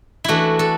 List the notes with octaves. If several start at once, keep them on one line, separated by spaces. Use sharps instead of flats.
E3 A3 D4 E4 F#4
A4